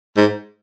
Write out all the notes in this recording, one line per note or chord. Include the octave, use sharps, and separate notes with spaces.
G#2